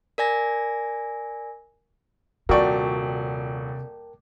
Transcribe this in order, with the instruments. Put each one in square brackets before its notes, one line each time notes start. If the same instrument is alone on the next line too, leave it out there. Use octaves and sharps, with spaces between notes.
[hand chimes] A#4 D5 G#5 A#6
[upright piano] D#1 C#6 [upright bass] C3 [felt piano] F#4 D5 [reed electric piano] A#4 G5 A5